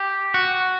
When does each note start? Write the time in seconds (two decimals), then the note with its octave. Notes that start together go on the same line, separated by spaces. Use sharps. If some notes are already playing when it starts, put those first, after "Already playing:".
Already playing: G4
0.34 F#4